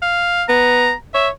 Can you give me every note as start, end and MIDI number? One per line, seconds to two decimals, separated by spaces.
0.02 0.44 77
0.49 0.92 59
0.49 0.94 82
1.14 1.30 73
1.14 1.28 76